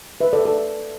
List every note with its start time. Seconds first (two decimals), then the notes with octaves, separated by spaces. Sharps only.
0.21 B4 E5
0.33 A4 D5
0.45 A4